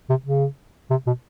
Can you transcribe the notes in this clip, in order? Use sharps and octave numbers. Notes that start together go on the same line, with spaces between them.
C3
C#3
C3
B2